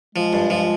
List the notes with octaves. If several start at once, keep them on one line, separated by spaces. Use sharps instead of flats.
F3 G#3
G2
F3